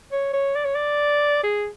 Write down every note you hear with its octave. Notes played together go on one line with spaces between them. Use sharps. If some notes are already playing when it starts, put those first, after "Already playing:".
C#5
C#5
D5
C#5
D5
G#4